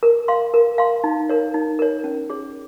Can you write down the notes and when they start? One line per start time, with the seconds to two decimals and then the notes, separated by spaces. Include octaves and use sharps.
0.03 A#4
0.28 F5 C6
0.54 A#4
0.78 F5 C6
1.04 D#4
1.30 A#4 C#5
1.54 D#4
1.79 A#4 C#5
2.04 C#4
2.30 G#4 C#5